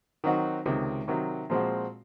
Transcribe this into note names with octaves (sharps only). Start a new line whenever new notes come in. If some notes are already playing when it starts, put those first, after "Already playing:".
D#3 F#3 C4 D#4 F#4
C#2 C3 D#3
C3 D#3 F#3
A#2 F3 G#3 C4 F#4